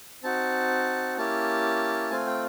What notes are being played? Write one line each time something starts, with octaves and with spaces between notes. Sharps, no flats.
C4 D#4 F#4 A5
A#3 C#4 E4 G4 A5
A3 C4 F4 G#5
G5